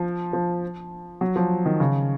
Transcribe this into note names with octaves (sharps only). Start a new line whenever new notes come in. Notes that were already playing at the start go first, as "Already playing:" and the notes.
Already playing: F3
F3
F#3
F3
D#3
C#3